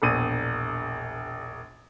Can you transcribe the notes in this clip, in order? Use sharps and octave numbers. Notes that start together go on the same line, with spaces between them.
E1 A#1 D#7